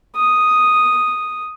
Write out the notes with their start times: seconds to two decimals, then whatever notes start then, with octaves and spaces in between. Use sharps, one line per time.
0.16 D#6